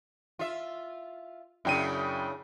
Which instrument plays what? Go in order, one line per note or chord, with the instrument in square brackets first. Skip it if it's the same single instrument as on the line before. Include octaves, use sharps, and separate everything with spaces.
[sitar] F4 E5
[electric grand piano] F#2 G5 D#7 [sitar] C#3 D4 E4